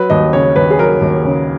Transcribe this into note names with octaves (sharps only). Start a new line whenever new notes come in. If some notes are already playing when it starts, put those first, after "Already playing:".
Already playing: F#3 B4
D#2 D#5
C#3 C#5
D#2 B4
G#4
F#3 A#4
D#2
C#3